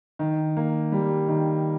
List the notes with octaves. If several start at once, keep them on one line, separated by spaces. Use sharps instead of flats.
D#3
A#3
G3
D#3